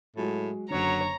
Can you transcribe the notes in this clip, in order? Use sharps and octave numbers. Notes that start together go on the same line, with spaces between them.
A2 F#3 G#3 F#4
F#1 D3 F#3 C#5 A#5